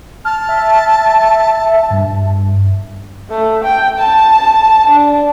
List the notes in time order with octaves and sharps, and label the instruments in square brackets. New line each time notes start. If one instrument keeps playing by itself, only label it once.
[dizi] A5 [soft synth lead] F6
[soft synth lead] E5
G2
[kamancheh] A3
G5
A5
D4